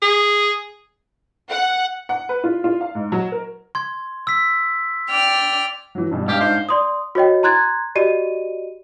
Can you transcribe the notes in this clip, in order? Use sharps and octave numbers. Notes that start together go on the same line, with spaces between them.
G#4
F#5
F#5
B4
F4
F4
F5
G#2
F#3
A#4
C6 G#6
E6 B6
D5 G5 F6
E3 F#3
G2 B2 G3
G#2 D4 G4 F5 F6
D#4 C5
D5 C6 D#6
F#4 C#5 D#5 G5
A#5 C6 F#6 G#6 A6
F#4 G4 D5 D#5 D#7